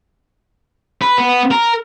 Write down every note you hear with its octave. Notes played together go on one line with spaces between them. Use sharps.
B4
B3
A#4